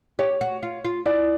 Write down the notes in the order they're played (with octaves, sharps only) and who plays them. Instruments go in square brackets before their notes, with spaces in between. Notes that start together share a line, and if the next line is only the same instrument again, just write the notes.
[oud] G4 [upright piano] C#5
[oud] F#4
F4
F4
[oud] E4 [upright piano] D5